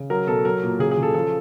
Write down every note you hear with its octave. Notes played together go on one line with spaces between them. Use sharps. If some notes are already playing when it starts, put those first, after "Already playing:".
Already playing: C#3
F#3 A#4
B2 A4
F#3 A#4
A#2
C#3 G#4
G#4
C#3
A4
F3 A4